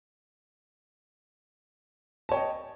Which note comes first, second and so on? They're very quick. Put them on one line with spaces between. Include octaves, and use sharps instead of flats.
A5 C#5 G5 D#5